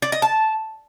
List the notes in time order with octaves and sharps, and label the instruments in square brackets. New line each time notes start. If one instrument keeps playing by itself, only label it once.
[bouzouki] D5
D#5
A5